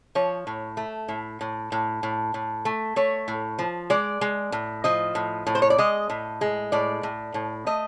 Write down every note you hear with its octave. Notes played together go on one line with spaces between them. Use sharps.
F3 C#5
A2
A3
A2
A2
A2
A2
A2
A3
A3 C#5
A2
F3
G#3 D5
G#3
A2
F3 D#5
A2
A2
C5
C#5
D5
G#3 D#5
A2
G#3
A2 D5
A2
A2
A3 D#5